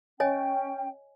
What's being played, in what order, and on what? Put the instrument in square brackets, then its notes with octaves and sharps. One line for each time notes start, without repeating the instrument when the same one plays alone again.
[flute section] C#4 G5 [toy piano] C#5 D#5 G#5